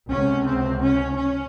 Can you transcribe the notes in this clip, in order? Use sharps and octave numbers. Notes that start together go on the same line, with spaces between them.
C#2 C3 C#4
C4
C#4
C#4